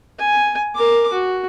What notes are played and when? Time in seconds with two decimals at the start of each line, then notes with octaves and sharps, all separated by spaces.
0.19 G#5
0.75 A#4 D6
1.13 F#4